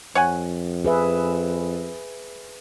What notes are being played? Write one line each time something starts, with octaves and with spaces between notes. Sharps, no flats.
F2 C#5 F#5 G#5
G#4 B4 E5